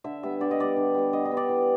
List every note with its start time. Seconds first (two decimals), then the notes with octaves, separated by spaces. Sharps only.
0.04 D3 E5
0.23 G3 B3 E5
0.40 D3 D5
0.51 D#5
0.59 G3 B3 D5
0.76 D3
0.95 G3 B3
1.13 D3 D#5
1.25 D#5
1.31 G3 B3
1.37 D5
1.49 E3